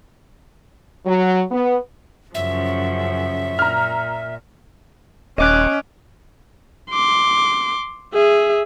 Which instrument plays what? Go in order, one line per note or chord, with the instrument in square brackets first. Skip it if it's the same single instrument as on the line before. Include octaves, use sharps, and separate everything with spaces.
[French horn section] F#3
B3
[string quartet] F#2 C#3 F3 [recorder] E5
[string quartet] A#2 [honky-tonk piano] A#5 F6
[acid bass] D#1 [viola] C#4 [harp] D#5 D6 F#6
[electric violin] C6 D6
G#4 E5